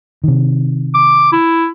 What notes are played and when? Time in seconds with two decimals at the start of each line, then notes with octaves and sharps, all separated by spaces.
0.24 C3 D#3
0.94 D6
1.32 E4